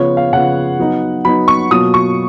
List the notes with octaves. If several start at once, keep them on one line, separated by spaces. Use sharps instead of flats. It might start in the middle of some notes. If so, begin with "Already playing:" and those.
Already playing: C#3 F3 B3 F4 C#5
F5
C#3 F3 B3 F4 F#5
F#3 B3 D#4
F#3 B3 D#4 B5
C#6
B2 F#3 A#3 F4 D#6
C#6